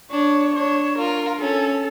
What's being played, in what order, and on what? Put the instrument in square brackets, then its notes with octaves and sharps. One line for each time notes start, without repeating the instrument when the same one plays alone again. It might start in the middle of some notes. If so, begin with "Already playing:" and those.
[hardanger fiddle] D4 [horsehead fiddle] C#5
[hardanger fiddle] D4 [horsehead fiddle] C#5
[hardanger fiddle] F4 [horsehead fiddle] A#4
[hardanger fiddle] C#4 [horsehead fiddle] A4